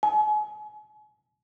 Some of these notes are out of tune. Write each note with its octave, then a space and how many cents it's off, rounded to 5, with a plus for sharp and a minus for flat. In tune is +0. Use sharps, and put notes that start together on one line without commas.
G#5 +40